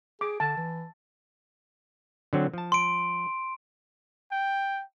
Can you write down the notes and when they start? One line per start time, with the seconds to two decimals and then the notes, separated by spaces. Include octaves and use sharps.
0.21 G#4 D6
0.40 D3 A5
0.57 E3
2.33 D3 F#3 C4
2.54 F3 A5
2.72 C6 D7
4.31 G5